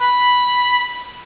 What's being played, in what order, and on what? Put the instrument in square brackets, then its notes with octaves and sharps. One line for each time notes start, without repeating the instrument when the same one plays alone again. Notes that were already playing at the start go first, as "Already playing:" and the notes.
[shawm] B5